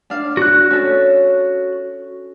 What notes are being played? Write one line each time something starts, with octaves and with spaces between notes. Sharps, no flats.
D4 F5
F#4 F#6
C#4 A4